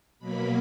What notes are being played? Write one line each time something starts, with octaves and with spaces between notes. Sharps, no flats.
B2 F#3 A#3 B5